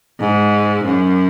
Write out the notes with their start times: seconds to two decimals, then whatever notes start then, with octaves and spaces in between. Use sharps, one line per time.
0.20 G#2
0.85 F#2